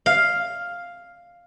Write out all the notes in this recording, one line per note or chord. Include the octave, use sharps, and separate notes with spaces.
F5